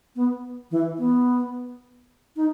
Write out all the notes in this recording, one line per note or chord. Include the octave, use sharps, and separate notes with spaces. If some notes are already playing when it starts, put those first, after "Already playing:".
B3
E3
B3
D#4